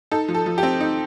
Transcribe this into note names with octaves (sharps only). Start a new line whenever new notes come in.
D#4 A4
F3
A4
F3
G4
C4
D#4